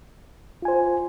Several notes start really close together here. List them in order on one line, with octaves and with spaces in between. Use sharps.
F4 G#5 C5